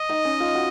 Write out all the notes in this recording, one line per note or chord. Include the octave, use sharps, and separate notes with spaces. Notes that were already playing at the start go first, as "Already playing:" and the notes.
Already playing: D#5
D#4
C#4
F4
F#4